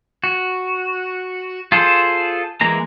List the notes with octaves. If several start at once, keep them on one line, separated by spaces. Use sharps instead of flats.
F#4
F4 G#4 A4 C5
E3 G#3 A#3 A#5